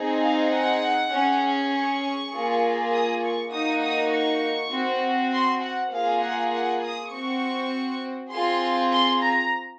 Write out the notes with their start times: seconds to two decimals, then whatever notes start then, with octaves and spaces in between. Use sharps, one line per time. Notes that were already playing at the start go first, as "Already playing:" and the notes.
Already playing: C4 D#4 G#4
0.23 F5
0.52 F#5
1.13 C#4 G#4
1.73 C#6
2.33 A#3 F4 G#4
2.93 D#6
3.23 C#6
3.52 A#3 D#4 F#4 D#6
3.83 D#6
4.13 C#6
4.72 C4 F#4
5.33 C6
5.62 F#5
5.92 A#3 F4 G#4 F5
6.22 F#5
6.53 F#5
6.83 D#6
7.13 C4 F#4 C#6
8.33 C4 F4 G#4 C6
8.93 C6
9.23 A#5